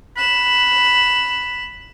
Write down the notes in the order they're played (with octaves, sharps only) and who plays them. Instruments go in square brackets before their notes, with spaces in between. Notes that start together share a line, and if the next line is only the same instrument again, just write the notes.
[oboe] B5 [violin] F#6 E7